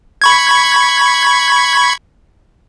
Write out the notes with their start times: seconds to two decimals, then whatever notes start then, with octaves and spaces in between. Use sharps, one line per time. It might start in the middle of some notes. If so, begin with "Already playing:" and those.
0.22 B5 C#6 G#6